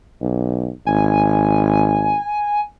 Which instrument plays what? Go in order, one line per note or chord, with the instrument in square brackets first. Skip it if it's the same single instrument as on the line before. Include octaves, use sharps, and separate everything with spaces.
[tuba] B1
[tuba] G#1 [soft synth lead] G#5